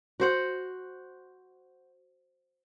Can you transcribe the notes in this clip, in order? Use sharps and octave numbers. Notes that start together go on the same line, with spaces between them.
F#4 C5 F#5